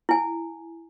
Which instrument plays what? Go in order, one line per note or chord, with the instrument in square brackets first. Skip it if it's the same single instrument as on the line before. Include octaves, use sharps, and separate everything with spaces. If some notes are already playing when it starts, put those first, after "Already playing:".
[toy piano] E4 G#5